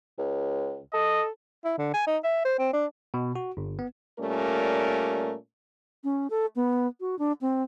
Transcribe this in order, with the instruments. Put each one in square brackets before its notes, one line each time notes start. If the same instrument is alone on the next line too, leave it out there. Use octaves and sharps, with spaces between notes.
[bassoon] C#2
[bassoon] A4 [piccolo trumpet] D#5
[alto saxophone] E4
D3
G#5
D#4
E5
C5
C4
D4
[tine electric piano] B2
F#4
G1
B3
[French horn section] A#2 G3 A3 C#4 A#4
[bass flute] C#4
A4
B3
F#4
D4
C4